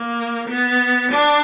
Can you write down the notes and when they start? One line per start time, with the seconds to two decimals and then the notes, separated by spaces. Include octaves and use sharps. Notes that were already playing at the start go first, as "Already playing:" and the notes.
Already playing: A#3
0.47 B3
1.11 D4